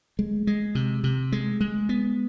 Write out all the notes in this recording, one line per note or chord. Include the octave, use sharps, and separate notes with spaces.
G#3
G#3
C3
C3
G#3
G#3
B3